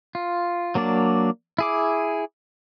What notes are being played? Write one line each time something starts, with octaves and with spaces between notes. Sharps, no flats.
F4
F#3 A#3 D4 D5
E4 G#4 D6